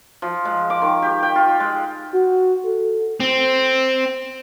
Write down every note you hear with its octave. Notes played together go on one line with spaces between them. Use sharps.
F3
G#3
D6
D#3
G4
G5
F4
G#3
F#4
A4
C4